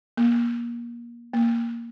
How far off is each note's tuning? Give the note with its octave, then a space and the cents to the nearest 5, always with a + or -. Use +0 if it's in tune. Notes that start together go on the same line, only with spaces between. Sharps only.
A#3 +25
A#3 +5